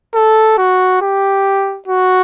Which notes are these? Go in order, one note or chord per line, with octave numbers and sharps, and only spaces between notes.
A4
F#4
G4
F#4